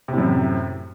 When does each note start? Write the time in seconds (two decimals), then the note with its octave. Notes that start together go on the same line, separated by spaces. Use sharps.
0.08 C3
0.13 A2
0.18 F#2